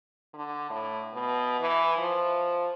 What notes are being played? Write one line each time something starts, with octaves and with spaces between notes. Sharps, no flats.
D3
A2
B2
E3
F3